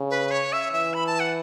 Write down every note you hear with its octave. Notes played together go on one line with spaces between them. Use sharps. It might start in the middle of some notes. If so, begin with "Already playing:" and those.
Already playing: C#3
B4
C#5
E5
E3 E5
B5
A5
F#5